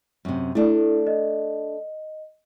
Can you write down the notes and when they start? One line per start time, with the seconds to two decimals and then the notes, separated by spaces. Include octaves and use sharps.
0.25 F#2 C3
0.55 A3 D4 E4 A4
1.07 D#5